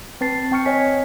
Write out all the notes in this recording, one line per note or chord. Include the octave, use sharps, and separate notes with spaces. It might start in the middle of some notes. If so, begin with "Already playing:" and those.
C4 B4 A5 A6 C7
C4 G5 C#6 F6 C#7
C#5 D#5 G#5 B6